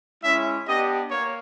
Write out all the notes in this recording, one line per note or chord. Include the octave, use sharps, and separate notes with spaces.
G#3 C#4 E4 E5
B3 D4 G4 D#5
A#3 C#5